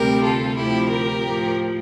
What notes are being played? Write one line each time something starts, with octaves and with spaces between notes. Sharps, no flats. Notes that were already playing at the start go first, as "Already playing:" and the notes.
Already playing: D2 C3 G3 G4 A#4
F4 A4
D2 C3 F3 E4 G4
G4 A#4
A2 F3